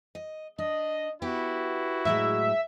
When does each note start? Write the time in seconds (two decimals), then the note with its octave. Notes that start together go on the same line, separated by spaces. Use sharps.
0.15 D#5
0.59 D4 D#5
1.22 B3 E4 F#4 G4
2.05 A2 F#3 G#3 E5